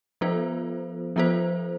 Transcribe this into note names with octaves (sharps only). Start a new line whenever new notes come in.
F3 B3 F4 A4 C5
F3 B3 F4 A4 C5